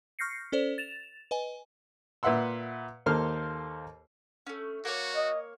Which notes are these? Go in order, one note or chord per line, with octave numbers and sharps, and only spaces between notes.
C#6 F6 G6 A#6 C7 C#7
C#4 A4 C5 D5
A6 E7 F7
B4 D#5 G#5
A#2 B4 E5 F#5 C6 E6
D#2 A#3 A4 C5 C6 F6
A3 C#4
A#3 F#4 C#5
D#5